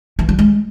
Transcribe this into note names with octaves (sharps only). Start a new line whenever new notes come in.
E3
G3
G#3